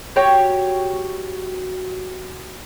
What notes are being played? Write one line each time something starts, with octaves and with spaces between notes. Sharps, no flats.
F#4 G4 C#5 G5